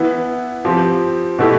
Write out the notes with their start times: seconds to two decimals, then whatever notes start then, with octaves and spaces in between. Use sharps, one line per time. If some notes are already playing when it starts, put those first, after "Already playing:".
Already playing: E3 B3 E4
0.65 F3 C4 G4
1.39 B2 A3 E4 G4